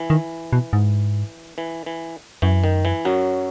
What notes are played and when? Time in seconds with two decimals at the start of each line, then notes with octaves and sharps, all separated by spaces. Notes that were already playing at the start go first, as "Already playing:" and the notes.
Already playing: E3
0.10 D#3
0.53 B2
0.73 G#2
1.58 E3
1.86 E3
2.42 F#2 E3
2.64 D#3
2.85 E3
3.05 F#2 F#3